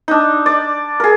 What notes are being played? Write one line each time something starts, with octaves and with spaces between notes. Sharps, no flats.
D4 D#4
D5
G#4 A#4